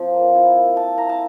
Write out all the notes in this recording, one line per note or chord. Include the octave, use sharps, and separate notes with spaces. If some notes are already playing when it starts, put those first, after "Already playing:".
Already playing: F3 C4
A#3
E4
A#3
A#3 A5
E4 A#5
A5